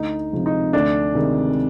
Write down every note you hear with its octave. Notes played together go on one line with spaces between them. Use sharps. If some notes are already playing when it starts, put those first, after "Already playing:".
Already playing: D2 D#4
C3 F3 G#3
D#4
D2 D4
C3 D#3 G#3